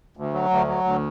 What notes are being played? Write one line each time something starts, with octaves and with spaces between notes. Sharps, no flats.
D2
F#3
D2
F#3
D2